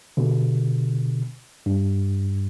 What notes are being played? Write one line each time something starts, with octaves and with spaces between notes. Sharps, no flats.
B2 D3
G2